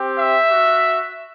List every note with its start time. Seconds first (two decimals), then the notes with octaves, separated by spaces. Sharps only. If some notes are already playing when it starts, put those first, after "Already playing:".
Already playing: C4 G4
0.17 E5
0.48 F#4